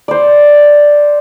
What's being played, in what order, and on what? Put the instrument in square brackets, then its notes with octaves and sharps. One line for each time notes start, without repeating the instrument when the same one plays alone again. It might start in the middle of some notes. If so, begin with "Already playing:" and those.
[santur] C5 D5